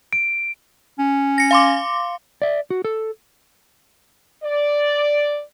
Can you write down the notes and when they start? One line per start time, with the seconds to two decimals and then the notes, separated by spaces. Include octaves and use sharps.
0.13 D7
0.99 C#4
1.38 A#6 C#7
1.51 F5 C6 D6
2.42 D5 E5
2.71 F#4
2.85 A4
4.43 D5